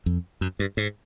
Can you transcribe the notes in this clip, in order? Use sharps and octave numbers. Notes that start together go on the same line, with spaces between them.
F2
F#2
G2
G#2